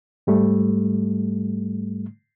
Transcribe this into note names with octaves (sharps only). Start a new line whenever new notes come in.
G#2 G3 A3